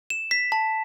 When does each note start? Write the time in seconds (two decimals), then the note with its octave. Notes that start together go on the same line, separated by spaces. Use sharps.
0.10 E7
0.31 B6
0.52 A5